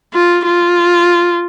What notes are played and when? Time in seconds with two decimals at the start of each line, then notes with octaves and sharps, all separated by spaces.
0.14 F4
0.46 F4